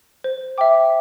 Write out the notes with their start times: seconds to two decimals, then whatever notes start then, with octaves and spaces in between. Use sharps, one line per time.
0.24 C5
0.58 E5 G5 D6